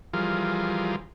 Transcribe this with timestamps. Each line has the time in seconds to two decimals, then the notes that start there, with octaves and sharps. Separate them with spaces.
0.13 E3 F3 G3 F4 G#4 A#4